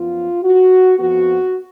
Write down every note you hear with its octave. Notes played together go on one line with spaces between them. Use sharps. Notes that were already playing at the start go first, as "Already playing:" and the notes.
Already playing: F#2 F3 B3 F4
F#4
F2 F3 B3 F#4